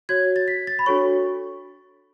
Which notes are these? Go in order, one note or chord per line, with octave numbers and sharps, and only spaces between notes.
F#4 C#5 G#6
A6
B6
A6
B5
D4 F#4 A4 C#5 C#6